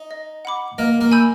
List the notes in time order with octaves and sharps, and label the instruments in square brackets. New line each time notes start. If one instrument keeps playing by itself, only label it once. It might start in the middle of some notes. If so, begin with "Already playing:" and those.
Already playing: [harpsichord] D#4
[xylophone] D#5
F#5 B5 D6
[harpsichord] A#3 [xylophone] D#5
[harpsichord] A#3
[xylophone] G#5 B5 E6 G6